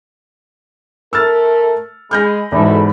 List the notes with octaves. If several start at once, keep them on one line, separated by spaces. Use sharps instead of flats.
A3 A#4 E6 F6 A6
G#3 B5 F6 G6 A#6
E2 G#2 B2 A3